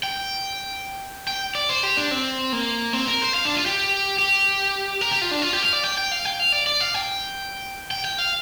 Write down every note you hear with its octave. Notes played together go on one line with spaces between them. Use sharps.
G5
G5
D5
C5
G4
D4
C4
A#3
C4
A#4
C5
F5
D4
F4
G4
G4
A#4
G4
F4
D4
F4
G4
F5
D5
G5
G5
F5
G5
F5
D5
D5
F5
G5
G5
G5
F5